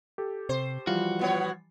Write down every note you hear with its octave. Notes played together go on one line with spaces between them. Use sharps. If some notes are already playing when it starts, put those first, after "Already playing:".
G4 A4
C3 C5
E3 F3 G3 F4 F#4
B2 B3 C#5